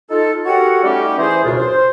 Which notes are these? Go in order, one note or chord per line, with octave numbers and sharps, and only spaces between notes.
D#4 F4 A4
F#4 G4 A4 A#4 C#5 F#5
G3 A3 C#4 D#4 G4
E3 G#4 C5
C#2 F#2 B2 D4 F4
C5